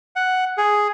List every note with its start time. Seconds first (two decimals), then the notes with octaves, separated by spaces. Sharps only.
0.16 F#5
0.57 G#4